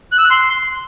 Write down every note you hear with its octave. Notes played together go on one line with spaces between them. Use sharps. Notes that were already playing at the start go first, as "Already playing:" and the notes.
F#6
E6
F#6
C6